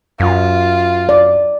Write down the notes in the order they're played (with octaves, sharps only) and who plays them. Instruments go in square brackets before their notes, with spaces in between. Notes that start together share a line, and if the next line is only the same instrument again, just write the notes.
[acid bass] F#2 [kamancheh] F4
[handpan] D5